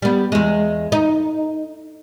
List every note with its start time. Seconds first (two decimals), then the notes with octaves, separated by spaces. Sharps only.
0.02 G3 B3
0.32 E2 G#3
0.92 D#4